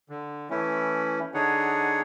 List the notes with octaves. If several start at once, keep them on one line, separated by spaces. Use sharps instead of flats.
D3
E3 A3 C#4 E4
D3 D4 D#4 G#4 C#5 F#5